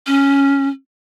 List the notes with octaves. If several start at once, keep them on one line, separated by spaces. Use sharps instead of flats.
C#4